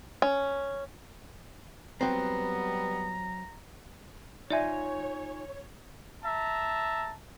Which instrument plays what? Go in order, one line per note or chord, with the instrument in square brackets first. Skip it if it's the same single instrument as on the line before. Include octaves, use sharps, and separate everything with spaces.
[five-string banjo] C#4
[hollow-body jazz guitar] F#3 C4 [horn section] G3 B3 [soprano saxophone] A#5
[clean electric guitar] D#4 F4 G#5 [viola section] C#5 [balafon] D5 E5
[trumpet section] E5 A5 A#5